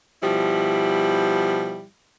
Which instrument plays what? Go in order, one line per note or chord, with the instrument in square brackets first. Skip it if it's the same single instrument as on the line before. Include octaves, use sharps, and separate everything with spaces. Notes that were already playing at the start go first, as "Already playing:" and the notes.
[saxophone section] B2 F3 G3 E4